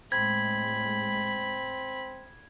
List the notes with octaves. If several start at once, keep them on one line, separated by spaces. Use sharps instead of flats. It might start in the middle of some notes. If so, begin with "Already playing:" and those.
A2 G#3 C4 B5 G#6